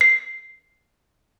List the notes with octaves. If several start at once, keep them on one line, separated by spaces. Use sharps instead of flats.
C7